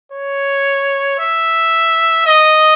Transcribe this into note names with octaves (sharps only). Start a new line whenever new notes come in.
C#5
E5
D#5